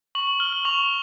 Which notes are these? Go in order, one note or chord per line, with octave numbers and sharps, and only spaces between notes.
C#6 F#7
F#7
F6 G7
F#7
C#6 F7